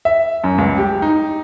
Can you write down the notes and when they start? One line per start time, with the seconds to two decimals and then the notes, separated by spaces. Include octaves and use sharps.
0.05 E5
0.44 F#2
0.58 C#2
0.78 G4
1.02 D#4